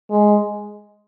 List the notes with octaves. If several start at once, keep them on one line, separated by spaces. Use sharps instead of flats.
G#3